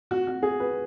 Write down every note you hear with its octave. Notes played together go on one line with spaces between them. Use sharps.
F#4
F#4
G#4
B4